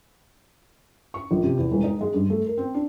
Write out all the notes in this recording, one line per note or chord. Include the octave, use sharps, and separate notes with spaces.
C#6
A#1
C3
E2
E1
D#4
G#3
G2
A3
A#4
C4
D4